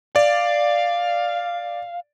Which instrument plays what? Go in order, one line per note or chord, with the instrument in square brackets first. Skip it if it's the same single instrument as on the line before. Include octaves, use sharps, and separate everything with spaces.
[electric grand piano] D5 [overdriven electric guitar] F5